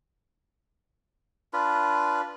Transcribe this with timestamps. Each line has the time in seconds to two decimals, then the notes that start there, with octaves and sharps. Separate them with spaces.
1.53 D4 F4 B4